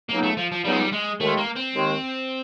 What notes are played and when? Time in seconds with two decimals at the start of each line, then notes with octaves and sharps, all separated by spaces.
0.09 C#2 C#3 F#3 A#3 B3 D#4
0.23 A3
0.37 F3
0.52 F3
0.64 C#2 C#3 F#3 G3 B3 D#4
0.72 G#3
0.79 G3
0.92 G#3
1.19 D#2 D#3 G#3 A3
1.37 A#3
1.56 C4
1.74 D#2 D#3 G#3